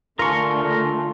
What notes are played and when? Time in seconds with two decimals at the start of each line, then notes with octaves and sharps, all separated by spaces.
0.19 D3 A3 F4 A#4 G#5 A5 C6 C#6